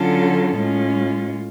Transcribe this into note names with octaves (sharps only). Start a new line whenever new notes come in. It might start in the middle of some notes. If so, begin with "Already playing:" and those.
Already playing: D3 F#3 C#4 F4 A4
A2 G#3 C#4 F4